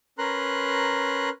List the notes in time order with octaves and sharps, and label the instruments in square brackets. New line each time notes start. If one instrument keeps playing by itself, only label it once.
[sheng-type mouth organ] C#4 A#4 B4 A#5 C6 F#6